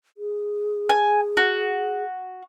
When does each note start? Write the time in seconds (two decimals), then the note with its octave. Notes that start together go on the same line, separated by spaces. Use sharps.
0.18 G#4
0.89 G#5
1.37 F#4